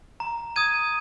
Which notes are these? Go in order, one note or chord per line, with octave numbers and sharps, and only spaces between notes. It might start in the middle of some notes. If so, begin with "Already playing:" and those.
A#5
D#6 G#6 D#7